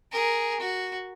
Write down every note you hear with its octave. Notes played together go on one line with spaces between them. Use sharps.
G#4 A#4
F#4